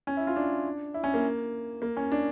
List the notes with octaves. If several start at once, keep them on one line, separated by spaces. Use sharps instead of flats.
C#4
E4
F4
D4
E4
C#4
A#3
A#3
C#4
D4